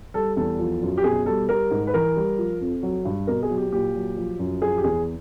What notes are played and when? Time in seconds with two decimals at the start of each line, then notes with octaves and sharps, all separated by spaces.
0.14 G3 A4
0.37 E2 A4
0.59 F3
0.82 F#2
0.98 G4
1.04 B2 G#4
1.26 G3 A4
1.49 G3 A#4
1.71 G#2
1.87 B4
1.94 E3 A#4
2.16 G3
2.38 F3
2.61 F2
2.83 F#3
3.05 G2
3.27 B2 A#4
3.43 G#4
3.50 F#3
3.58 G4
3.72 A#2 G4
3.95 F#3
4.17 F3
4.39 F#2
4.62 F3 G#4
4.78 G4
4.84 E2 G#4